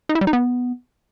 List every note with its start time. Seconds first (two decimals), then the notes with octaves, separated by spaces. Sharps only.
0.09 D#4
0.15 E4
0.21 G3
0.27 D#4
0.33 B3